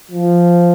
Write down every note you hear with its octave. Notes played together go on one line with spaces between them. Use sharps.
F3